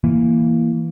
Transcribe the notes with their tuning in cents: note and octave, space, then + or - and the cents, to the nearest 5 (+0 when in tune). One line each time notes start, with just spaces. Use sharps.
E3 +0 A#3 +0